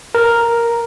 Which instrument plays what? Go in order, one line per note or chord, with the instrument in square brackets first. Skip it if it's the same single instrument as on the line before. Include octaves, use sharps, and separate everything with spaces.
[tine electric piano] A#4